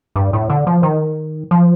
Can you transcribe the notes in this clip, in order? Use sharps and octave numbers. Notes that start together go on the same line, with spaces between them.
G2
A2
D3
F3
D#3
F3